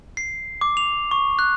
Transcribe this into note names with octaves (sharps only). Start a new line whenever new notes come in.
C7
D6
F7
C#6
F#6